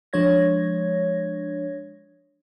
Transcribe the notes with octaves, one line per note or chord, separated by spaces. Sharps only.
F3 G#3 D4 C#5 G#6 A#6